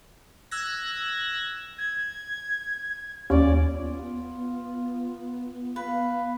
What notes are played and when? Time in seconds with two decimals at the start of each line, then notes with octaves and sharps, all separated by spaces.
0.51 E6 F#6 G#6 A#6
1.78 G#6
3.30 D#2 C#4 D5
3.75 B3 F4
5.76 B4 F5